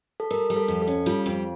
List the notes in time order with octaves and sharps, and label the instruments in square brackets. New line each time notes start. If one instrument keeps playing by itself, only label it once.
[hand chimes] A4
[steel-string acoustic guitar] G3 [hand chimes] A#4
[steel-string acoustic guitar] G3
[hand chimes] A4
[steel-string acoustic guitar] F2
[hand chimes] A4
[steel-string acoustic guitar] C#4
[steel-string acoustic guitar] G3 [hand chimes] F4
[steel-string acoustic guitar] F2